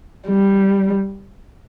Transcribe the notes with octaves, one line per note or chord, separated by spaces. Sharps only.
G3